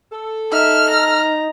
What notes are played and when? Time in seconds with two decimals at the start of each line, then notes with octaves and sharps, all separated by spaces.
0.12 A4
0.52 D#4 E5 F6
0.89 A#5